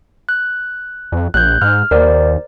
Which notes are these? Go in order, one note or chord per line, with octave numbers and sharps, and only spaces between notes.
F#6
F2
A#1 F#6 G6
G#2 F6
D#2 A#4 C5 D5